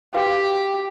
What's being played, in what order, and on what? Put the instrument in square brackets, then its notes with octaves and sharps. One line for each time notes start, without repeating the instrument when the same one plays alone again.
[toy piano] F#4 B4 F5 [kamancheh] G4